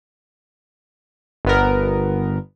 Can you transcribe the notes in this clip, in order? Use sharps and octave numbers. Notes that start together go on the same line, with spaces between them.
G1 B3 A#4